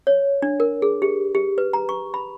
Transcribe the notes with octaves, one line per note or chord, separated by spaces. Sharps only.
C#5
D4
A#4
G#4
G4
G4
B4
A#5
C#6
B5